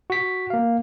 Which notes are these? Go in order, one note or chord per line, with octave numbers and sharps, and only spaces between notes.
F#4 B6
A#3 F5